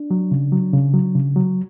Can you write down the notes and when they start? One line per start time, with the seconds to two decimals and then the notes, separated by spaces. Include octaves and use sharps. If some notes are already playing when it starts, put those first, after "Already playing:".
Already playing: D4
0.11 F#3
0.31 C#3
0.52 F#3
0.73 C#3
0.94 F#3
1.15 C#3
1.36 F#3